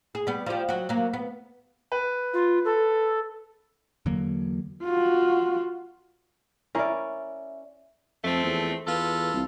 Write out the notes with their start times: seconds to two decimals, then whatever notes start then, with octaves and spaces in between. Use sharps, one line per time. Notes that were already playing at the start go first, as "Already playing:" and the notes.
0.15 G#4
0.27 G3 B3
0.46 F3 G4
0.69 F#3 F#4
0.89 F#3 A#3
1.13 B3
1.92 B4
2.33 F4
2.64 A4
4.06 E2 D3 F#3 A#3
4.83 F4 F#4
6.75 C#4 E4 A#4 D5 E5
8.24 F2 F3 A3 C4
8.43 E2
8.87 E2 F4 A4 B4
9.34 C2